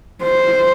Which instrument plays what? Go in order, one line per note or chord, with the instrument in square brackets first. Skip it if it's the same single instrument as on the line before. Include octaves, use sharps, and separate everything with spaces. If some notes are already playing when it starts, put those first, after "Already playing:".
[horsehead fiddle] C5